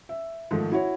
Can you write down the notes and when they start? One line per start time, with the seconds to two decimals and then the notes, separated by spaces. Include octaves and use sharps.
0.09 E5
0.51 G#2 D#3 F3 A3
0.72 E4 F#4 C#5